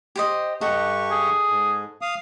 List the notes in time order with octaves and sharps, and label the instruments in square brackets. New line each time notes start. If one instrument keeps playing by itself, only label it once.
[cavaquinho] G4 C5 D#5
[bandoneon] G2 G4 C#6 [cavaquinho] A4 D#5 F#5
[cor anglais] G#4
[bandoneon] G#2
F5 D#6